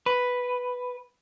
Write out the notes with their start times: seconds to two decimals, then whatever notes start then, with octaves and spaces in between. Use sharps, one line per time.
0.06 B4